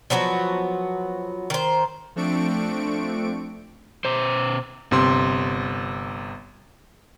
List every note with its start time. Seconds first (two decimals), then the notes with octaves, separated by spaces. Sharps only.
0.10 F3 F#3 B3 F#4
1.50 D#3 C5
2.16 F3 A3 C4 D4 C#6 D7
4.05 B2 C5
4.91 G1 C3 C6